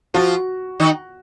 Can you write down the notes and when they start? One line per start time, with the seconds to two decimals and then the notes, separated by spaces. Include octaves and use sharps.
0.14 F3 F4 F#4
0.80 D#3 D#4